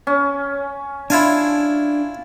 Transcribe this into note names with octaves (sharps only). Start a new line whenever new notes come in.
C#4
D4 E4 F4 G#5